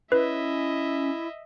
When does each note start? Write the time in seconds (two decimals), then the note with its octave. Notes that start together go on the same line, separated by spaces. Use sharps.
0.12 C#4 E4 B4 D#5 E5